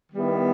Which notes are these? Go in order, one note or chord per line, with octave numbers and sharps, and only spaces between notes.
D#3 G3 B3 E4 G4